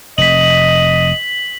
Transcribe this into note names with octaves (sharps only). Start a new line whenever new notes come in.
F1 D#5 B6 F#7